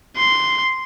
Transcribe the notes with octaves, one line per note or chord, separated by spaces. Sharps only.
C6